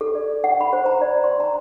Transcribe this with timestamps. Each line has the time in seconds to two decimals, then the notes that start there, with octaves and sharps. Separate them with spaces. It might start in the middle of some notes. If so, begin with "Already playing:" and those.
0.01 A4
0.15 D5
0.44 F#5
0.61 B5
0.73 C5
0.86 A#5
1.01 D5
1.24 C6
1.40 A#5